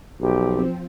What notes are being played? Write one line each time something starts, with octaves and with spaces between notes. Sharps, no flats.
B1 F3 C4 G4